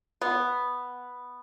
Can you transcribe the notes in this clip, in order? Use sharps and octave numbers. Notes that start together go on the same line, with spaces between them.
B3